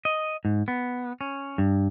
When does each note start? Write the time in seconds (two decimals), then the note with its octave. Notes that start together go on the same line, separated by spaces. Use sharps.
0.05 D#5
0.45 G#2
0.68 B3
1.21 C#4
1.58 G2